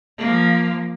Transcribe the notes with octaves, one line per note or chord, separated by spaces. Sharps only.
F3 A#3